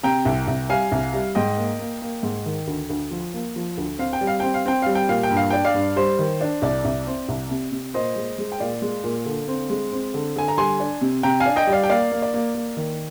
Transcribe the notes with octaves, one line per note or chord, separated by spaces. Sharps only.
C3 G5 A#5
C2
C2
G3 F5 G#5
C2
G3
G#2 D#5 G5
A#3
A#3
A#3
G#2
D#3
D2
D2
F3
A#3
F3
D2
C4 F5
G5
G3
F5
C4 G5
F5
C4 G5
G3 F5
G5
A#2 F5
G5
G2
F5
D4 G5
D5 F5
G2
G3 C5
D#3
D4
C2 D5
C2
C4
C2
C3
C3
A#2 C5 D#5
G#3
G#3
G5
A#2 D5 F5
G#3
A#2
D3
C4
G#3
C4
D3
D3 G#5
A#5
G3 G#5 C6
D4
C3
C3 G5 A#5
F5 G#5
D4
D#5 G5
G3
D5 F5
G5
A#3 D5 F5
A#3
D5
A#3
A#3
D#3